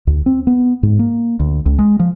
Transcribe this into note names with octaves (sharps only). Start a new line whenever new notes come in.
D2
C4
B3
G#2
A#3
D2
C#2
G#3
F3